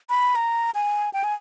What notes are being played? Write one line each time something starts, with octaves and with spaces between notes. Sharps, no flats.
B5
A#5
G#5
G5
G#5